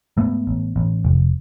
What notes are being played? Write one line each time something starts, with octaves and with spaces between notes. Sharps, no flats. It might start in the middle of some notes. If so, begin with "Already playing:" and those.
G#2 A3 B3
A1
A1
F1